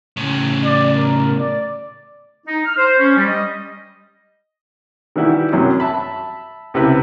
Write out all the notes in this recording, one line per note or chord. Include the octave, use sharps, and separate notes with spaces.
A2 C#3
D5
A#4
D5
D#4
F6
C5
C#4
G3
D#5
D#3 E3 G3 E4 F#4 G4
C2 F#2 F#3
E5 A5 B5
C#2 C3 E4 B4